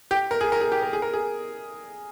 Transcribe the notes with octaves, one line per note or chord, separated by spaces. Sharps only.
G4
A#4
G#4
A#4
G#4
G4
A#4
G#4
A#4
G#4